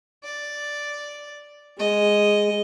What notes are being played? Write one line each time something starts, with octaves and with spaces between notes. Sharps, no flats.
D5
G#3 D#5